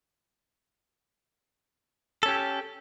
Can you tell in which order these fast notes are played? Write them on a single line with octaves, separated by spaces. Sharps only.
A4 C#4 G4